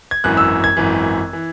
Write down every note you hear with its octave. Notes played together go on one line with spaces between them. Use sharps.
G#6
G#1 F#2 E3 F#6
E6
G#6
G#1 F#2 E3
E3